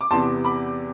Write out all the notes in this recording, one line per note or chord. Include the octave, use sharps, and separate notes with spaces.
D6
E2 C3 E3 B3 A5 C6
B5 D6